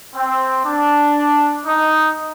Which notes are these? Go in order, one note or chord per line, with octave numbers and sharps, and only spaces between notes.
C4
D4
D#4